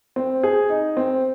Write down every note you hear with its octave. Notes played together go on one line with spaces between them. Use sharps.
C4
G#4
D#4
C4